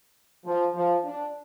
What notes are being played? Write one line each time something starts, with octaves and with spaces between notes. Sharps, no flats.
F3
F3
D4